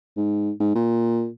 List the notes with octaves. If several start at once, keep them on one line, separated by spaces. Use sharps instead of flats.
G#2
G#2
A#2